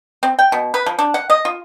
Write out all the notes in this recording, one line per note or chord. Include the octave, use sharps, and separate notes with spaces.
C4
G5
B2
B4
F3
D4
F#5
D#5
F4